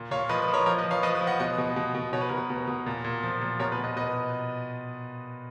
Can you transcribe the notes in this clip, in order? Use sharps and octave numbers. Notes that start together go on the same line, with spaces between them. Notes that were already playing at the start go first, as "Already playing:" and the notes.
Already playing: A#2
A#2 C#5 F5
F3 B4 D#5
B4
F3
A#4 C#5
F3 A#4 C#5
B4 D#5
F3
C#5 F5
F3 B4 D#5
B4
F3
D#5 F#5
B2 B4 D#5
B2
B2
B2
B2 C#5
B4
B2 A#4
B4
B2
B2
A#2
A#2
F3
A#2
B2 A#4 C#5
B4
B2
B4 D#5
B2 B4 D#5